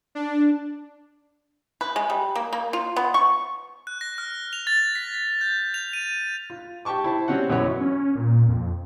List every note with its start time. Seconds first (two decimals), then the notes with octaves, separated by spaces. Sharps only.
0.15 D4
1.81 B4
1.96 G#3
2.10 G3
2.35 A#3
2.53 A#3
2.73 F4
2.96 B3
3.14 C#6
3.87 F#6
4.01 A#6
4.18 F6
4.53 F7
4.67 A6
4.95 B6
5.14 B6
5.41 G6
5.74 F7
5.93 D#7
6.50 F4
6.85 G4 G5 A5 C#6 D6
7.04 E4 C5 A5
7.28 G3 C4 C#4 F#4 F#5
7.49 B1 F#2 E3 F#4 C#5 B5
7.81 C#4
8.15 A#2
8.49 F2